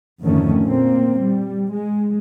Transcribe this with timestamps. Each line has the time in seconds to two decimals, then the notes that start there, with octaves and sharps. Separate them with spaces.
0.23 F2 G#2 D3 D#3 A3 C#4
0.62 A#2 A#3 C4
1.23 G3
1.75 G#3